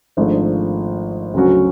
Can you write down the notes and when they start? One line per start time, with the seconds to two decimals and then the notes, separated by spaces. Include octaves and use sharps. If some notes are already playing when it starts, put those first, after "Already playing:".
0.17 G#1 G#2 F3 A3 D4
1.34 D2 C#3 F#3 C#4 F#4